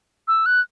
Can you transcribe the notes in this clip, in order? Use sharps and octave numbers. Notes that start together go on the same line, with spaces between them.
E6
F#6